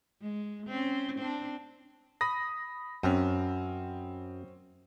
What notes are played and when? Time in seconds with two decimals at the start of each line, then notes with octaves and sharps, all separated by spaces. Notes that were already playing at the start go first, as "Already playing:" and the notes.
0.22 G#3
0.66 C4 C#4
1.18 C4 D4
2.21 B5 D#6 A#6
3.03 F#2 C4 C#4